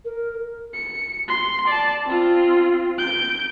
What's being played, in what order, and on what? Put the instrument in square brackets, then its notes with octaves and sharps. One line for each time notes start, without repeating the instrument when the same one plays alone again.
[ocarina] A#4
[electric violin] C#7
C6
D5 A5
C4 F4
G6 D7